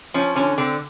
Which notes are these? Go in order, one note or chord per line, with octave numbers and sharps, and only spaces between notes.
F3 C#4
D3 C#4
D3 C4